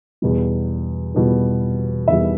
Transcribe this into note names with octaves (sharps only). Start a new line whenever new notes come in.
E2 B2 G3
E2 B2 G3
E2 B2 G3 E5